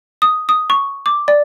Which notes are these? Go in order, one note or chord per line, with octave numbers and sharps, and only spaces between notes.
D#6
D#6
C#6
D6
D5